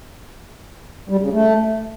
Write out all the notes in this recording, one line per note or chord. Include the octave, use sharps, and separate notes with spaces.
G3
C#3
A3